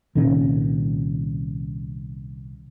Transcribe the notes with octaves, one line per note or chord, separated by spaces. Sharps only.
C2 A#2 D#3 C#4